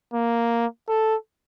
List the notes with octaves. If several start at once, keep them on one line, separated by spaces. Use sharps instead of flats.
A#3
A4